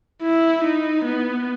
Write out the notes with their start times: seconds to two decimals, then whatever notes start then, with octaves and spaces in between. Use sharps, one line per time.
0.23 E4
0.64 D#4
1.05 B3